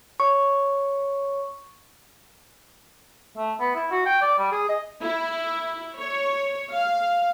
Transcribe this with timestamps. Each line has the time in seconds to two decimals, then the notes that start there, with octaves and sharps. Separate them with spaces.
0.20 C#5 C#6
3.37 A3
3.60 B3
3.76 E4
3.91 F#4
4.06 G5
4.22 D5
4.39 G3
4.52 G#4
4.69 D#5
5.04 E4
5.98 C#5
6.72 F5